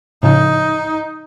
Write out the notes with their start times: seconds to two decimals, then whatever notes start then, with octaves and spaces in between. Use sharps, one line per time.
0.23 A2 C#3 F3 D#4